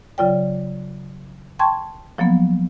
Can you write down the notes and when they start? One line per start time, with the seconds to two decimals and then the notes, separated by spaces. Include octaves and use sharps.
0.18 C#3 F#3 F4 D5 G5
1.59 G5 A5 C6 C#6 G#6
2.18 F3 F#3 A#3 B3